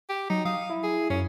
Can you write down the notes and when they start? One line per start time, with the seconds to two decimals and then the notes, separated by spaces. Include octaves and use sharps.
0.09 G4
0.30 F#3 D#4
0.45 F5 D#6
0.70 E4
0.83 G#4
1.10 F#2 C#4